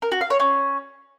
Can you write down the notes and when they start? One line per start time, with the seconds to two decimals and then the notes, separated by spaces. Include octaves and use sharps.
0.02 A#4
0.12 F#4
0.21 F5
0.30 C#5
0.40 C#4